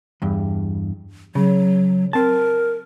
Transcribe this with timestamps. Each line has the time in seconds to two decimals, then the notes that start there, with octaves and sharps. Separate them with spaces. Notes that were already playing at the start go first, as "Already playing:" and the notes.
0.22 E2 G2
1.35 C#3 F#3
2.13 C4 A#4 A5